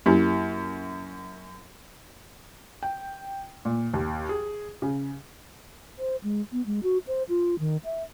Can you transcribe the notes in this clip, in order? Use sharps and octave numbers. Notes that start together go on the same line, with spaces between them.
F#2 A#3 E4 G4
G5
A#2
D#2
G#4
C#3
C5
G#3
B3
G#3
F#4
C5
F4
D#3
E5